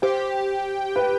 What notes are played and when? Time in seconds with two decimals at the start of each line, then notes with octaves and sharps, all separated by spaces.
0.02 G4 C5
0.96 B4